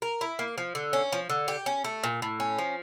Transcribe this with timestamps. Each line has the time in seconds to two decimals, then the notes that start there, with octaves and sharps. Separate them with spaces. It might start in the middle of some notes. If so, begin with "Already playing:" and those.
0.02 A#4
0.21 E4
0.39 A#3
0.58 F3
0.75 D3
0.93 C#4
1.12 F3
1.30 D3
1.48 G4
1.66 C#4
1.84 A3
2.03 A#2
2.22 A2
2.40 C#4
2.59 F3